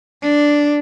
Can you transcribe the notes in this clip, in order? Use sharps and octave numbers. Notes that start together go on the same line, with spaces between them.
D4